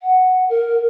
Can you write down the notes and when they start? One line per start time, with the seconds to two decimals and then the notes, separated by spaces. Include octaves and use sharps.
0.01 F#5
0.49 A#4